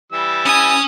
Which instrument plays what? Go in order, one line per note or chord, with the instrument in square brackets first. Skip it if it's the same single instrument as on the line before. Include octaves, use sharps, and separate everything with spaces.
[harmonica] E3 G3 E6
[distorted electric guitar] C#4 G#5 [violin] D#6